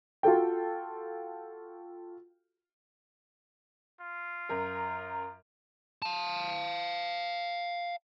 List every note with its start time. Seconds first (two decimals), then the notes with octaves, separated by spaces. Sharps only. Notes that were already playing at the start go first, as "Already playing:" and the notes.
0.23 F4 F#4 A4 G5
4.01 F4
4.49 F#2 A#4
6.02 F5 A5